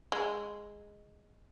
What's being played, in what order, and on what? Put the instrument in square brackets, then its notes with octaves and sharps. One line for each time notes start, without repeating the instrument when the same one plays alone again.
[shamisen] G#3